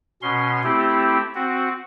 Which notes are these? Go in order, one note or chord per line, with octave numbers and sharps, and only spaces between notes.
B2 C#4 C6
A3 C4 E4 G4
C4 F#4